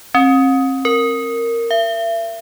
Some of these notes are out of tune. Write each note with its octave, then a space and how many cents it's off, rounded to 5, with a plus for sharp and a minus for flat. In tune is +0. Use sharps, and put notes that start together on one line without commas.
C4 +40
A#4 -10
E5 +40